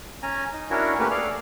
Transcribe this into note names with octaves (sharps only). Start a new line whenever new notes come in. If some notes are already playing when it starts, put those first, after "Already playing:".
C#4 G#5 A#5
D#4
C#4 D4 E4 F#4 A#4 C#5
A3 A#3 C#4 G4 B4
G#4 A4 D5 F5 F6